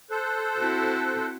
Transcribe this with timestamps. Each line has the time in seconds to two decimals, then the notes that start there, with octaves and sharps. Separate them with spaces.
0.10 A4 C5 F#6
0.57 C4 E4 F#4